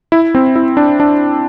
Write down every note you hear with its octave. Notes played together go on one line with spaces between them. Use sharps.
E4
C4
E4
D4
D4